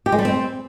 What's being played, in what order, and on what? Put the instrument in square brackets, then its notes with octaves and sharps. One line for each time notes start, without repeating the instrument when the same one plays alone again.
[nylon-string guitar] G4
G#3
G3
C4